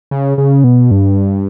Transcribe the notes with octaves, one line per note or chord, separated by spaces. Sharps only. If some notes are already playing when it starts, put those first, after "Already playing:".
C#3
C#3
B2
G2